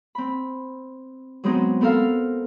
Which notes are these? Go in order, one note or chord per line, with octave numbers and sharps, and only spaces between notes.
C4 B5
F#3 G#3 B3 C4 D#4 G#4
B3 C4 A4 A#4 F5